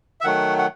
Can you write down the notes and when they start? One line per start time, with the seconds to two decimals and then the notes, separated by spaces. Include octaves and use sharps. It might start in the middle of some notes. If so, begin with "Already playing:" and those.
0.21 E5
0.24 D#3 F#3 A3 F#5
0.58 F#5